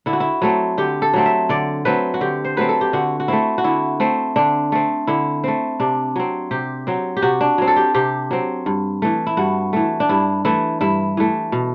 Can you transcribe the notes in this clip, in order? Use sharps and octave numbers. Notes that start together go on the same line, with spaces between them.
D3 E4
F#4
E4
F#3 A3 C4
D3 G4
A4
F#3 A3 C4
E5
D3 D5
F#3 A3 C4 B4
F#4
D3 G4
C5
F#3 A3 C4 B4
A4
G4
D3 F#4
F#4
A3 C4 E4
F#4
D3 E4
A3 C4
D3 D4
A3 C4
D3 E4
A3 C4
C3 D4
F#3 C4
C3 G4
F#3 C4
G4
C3 F#4
D4
F#3 C4
A4
G4
C3 G4
F#3 C4
G2
E3 A3
E4
G2 F#4
E3 A3
D4
G2 E4
E3 A3 E4
G2 E4
E3 A3
B2